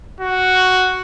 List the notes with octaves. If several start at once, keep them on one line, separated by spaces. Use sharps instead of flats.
F#4